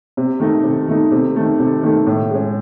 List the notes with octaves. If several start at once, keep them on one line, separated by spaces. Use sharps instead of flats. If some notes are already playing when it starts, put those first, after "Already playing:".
C3
D#3 A3 D#4
C3
D#3 A3 D#4
C3
D#3 A3
C3
D#3 A3
A2
G#3 C#4